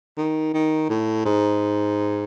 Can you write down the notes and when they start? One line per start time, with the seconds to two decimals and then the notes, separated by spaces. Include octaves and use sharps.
0.18 D#3
0.54 D#3
0.89 A2
1.25 G#2